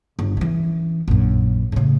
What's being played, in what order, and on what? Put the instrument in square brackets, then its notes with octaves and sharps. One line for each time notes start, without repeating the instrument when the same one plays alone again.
[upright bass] G1
E3 C#4
A#1 F#2
A2 C#3